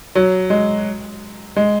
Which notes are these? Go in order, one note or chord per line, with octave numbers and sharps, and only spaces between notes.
F#3
G#3
G#3